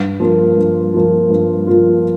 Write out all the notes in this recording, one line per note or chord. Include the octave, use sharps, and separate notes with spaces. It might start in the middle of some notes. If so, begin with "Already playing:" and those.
Already playing: G2
F3 A#3 F4
G2
F3 A#3 F4
G2
F3 A#3 F4